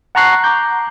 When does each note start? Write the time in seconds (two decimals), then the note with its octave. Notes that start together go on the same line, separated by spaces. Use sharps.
0.15 F#5 A5 A#5 C#6 F#6 C7
0.44 A#5 D6 G6